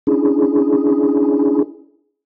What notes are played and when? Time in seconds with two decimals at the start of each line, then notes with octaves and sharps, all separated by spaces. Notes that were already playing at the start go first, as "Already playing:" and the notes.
0.07 C#4 D4 E4 G#4